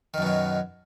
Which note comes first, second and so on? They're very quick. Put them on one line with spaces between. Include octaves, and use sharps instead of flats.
D#3 F#2 B2 F#3